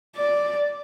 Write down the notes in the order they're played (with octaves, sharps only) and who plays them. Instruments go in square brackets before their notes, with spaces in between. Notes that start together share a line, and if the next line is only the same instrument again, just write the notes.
[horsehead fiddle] D5